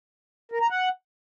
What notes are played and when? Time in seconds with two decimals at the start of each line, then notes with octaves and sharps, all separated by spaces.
0.52 A#4
0.61 A#5
0.70 F#5